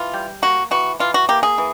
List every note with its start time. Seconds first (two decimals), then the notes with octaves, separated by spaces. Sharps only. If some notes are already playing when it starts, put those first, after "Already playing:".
Already playing: E3 F4
0.14 G3
0.42 A#3 F#4
0.71 E3 F#4
1.00 E3 F4
1.14 F#4
1.29 A#3 G4
1.43 G#4
1.58 E3